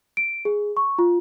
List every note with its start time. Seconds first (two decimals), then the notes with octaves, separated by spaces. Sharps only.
0.17 D7
0.45 G#4
0.77 C#6
0.99 F4